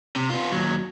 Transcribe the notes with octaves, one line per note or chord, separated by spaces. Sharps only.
C3
B3 F4
D#2 F#3